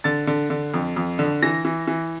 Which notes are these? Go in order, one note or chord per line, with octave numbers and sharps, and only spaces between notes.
D3 A6
D3
D3
F2
F2
D3
E3 A#6
E3
E3